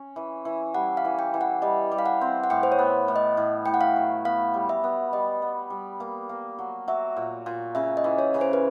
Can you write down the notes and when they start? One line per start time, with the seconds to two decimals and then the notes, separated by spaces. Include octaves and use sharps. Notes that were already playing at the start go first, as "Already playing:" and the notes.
Already playing: C#4
0.16 E3
0.45 E3
0.74 G3 F#5
0.97 F5
1.05 E3
1.19 G5
1.34 E3
1.41 F#5
1.62 G3 D#5
1.92 G3
1.99 F5
2.06 F#5
2.21 C4
2.44 F#5
2.50 A2 G5
2.63 C5
2.72 C#5
2.79 B3
3.08 A2
3.16 D#5
3.37 A2
3.66 A2 G5
3.74 F#5
3.81 F5
3.96 F#3
4.25 B3 F5
4.54 G3
4.69 E5
4.84 B3
5.13 G3 D#5
5.42 B3
5.70 G3
6.00 A#3
6.29 A#3
6.59 F#3
6.88 F#3 E5
7.17 A#2
7.46 A#2
7.75 C#3 E5
7.97 D#5
8.04 E3
8.18 C#5
8.34 C#3
8.41 C5
8.53 B4